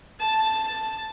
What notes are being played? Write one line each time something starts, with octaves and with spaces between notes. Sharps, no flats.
A5